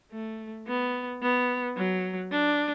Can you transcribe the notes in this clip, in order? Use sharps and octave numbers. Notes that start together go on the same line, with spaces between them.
A3
B3
B3
F#3
D4